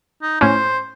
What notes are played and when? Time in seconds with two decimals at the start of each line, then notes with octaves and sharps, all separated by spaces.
0.22 D#4
0.41 A2 C#4 C5